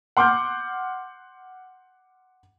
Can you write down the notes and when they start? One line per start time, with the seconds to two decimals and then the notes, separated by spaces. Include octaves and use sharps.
0.17 F#5 C6 D6 F6 G6